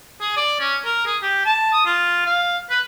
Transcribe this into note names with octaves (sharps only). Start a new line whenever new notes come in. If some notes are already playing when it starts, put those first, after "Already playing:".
G#4
D5
C#4
A#4
G#4
G4
A5
D#6
F4
F5
B4